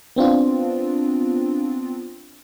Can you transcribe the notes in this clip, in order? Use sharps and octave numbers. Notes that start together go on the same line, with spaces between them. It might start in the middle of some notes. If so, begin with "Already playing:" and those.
B3 C4 D4 F4